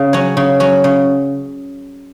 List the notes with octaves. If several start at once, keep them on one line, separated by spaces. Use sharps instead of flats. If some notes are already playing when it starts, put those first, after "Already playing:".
Already playing: C#3
F#3 C#4
C#3
F#3 C#4
C#3